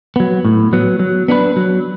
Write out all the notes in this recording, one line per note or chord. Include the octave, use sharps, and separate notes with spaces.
F#3 B3
A2
F#3 B3
F#3
B3 D4 F#4 B4
F#3